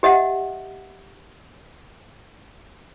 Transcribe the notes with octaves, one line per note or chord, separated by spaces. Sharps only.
G4 D#5 E5 F#5